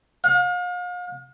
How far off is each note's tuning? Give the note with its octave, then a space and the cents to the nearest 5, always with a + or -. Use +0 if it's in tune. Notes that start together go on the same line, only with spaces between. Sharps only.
F5 +40